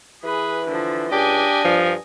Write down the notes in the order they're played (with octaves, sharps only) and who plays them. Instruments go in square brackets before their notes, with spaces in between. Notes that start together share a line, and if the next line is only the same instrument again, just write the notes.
[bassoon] E3 [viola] G#4 B4
[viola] D3 F3
[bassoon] C#2 [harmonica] D4 [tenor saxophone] G4 [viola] D#5 G#5
[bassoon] G2 [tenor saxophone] F3